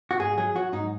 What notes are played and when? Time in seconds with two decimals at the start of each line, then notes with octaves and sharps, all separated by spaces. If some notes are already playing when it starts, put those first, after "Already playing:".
0.11 F#4
0.20 G#2 G#4
0.37 F#3 G#4
0.56 F#3 F#4
0.73 G#2 D#4